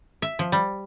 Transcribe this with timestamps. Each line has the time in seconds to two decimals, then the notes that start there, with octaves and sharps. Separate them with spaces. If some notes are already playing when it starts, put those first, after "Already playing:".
0.22 E5
0.39 F3
0.52 G3